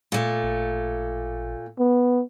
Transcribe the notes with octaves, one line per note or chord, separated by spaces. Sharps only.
A#2 A3
A1
B3